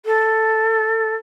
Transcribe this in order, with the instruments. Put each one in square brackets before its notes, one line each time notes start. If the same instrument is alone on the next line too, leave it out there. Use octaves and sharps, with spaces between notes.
[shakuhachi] A4